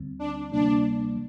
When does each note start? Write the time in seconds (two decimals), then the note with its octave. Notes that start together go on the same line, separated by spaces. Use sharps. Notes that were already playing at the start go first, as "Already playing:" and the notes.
Already playing: D2 D3 G3 C4
0.19 D4
0.52 D2 C3 G3 A#3 D4